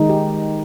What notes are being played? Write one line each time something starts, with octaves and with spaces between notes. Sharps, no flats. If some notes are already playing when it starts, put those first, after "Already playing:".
Already playing: D#3 G#3 D#4
G4